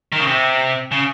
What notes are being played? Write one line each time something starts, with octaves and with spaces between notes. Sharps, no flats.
D#3
C#3
C3
C#3